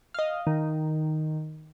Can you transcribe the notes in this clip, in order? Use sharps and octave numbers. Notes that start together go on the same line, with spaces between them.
D#5 F5
D#3